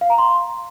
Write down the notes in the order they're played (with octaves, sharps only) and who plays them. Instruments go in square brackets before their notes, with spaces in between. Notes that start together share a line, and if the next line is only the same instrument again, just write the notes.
[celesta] F5
A#5
C6